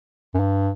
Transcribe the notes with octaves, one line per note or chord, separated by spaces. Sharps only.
F#2
G2